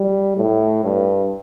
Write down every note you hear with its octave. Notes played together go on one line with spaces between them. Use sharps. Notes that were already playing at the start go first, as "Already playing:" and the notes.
Already playing: G3
A2
G2